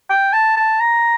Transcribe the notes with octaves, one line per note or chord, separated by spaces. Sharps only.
G5
A5
A5
A#5